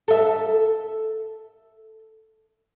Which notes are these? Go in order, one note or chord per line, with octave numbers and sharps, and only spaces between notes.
A4 E5